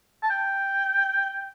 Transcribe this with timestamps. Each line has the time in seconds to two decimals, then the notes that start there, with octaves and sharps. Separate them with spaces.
0.22 A5
0.30 G5